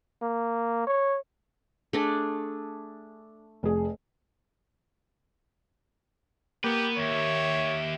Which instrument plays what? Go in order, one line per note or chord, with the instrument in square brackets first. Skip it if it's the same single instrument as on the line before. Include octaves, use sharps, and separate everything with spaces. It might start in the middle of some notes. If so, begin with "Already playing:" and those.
[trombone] A#3
C#5
[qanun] A3 D4 G#4
[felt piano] F1 G#4
[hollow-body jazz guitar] A#3 [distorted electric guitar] B3 B4 [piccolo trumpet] G4
[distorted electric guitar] D#2 [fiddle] G4 E5 [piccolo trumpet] C#5